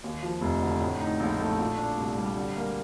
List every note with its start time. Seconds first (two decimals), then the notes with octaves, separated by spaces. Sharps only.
0.04 D#2
0.23 F3
0.41 F1
0.62 D3
0.81 A2
1.01 D#4
1.20 A#1
1.39 A3
1.59 A#2
1.78 D4
1.98 C2
2.17 G3
2.37 D3
2.57 A#3